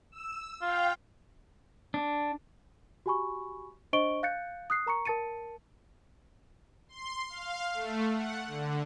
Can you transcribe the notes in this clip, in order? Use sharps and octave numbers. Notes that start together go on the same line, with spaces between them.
E6
F4 F5 G5
D4
F#4 G4 G#5 B5 C#6
D4 C5 D#5 C#6 D7 G7
F5 F#6 G6 A6 C#7
D#6 F#6 C7
A#4 A#5 C#6 C#7
A#4 A5 A6 C#7 D#7
C6
F5
A3
F#5
D3